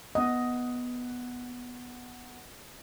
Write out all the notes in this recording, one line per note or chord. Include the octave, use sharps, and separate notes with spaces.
B3 D#5 F#5